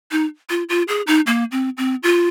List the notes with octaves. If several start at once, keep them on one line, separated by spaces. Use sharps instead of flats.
D#4
F4
F4
G#4
D#4
A#3
C4
C4
F4